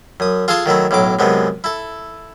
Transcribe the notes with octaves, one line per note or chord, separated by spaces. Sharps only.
F#2 D#6
F4 G#4 A4 G#5 A5 C6
D#3 F#3 A3 E4
B1 A2 F#3 D6
F#2 C3 G#3 B3
E4 A4